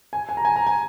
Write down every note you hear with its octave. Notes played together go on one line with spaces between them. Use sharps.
G#5
G#5
A#5
G#5
A#5
G#5